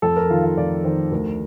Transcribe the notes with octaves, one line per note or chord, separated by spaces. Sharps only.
F2 A4
A#4
D#3 F4
F4
F2 D5
D#3 C5
D2 A#4